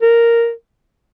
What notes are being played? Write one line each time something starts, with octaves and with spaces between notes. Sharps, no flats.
A#4